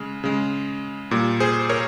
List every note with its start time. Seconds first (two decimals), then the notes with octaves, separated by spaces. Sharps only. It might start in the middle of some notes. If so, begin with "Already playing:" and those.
Already playing: C#3 G#3
0.24 C#3 G#3
1.11 A#2 G3
1.40 G#4 C5
1.69 A#4 C#5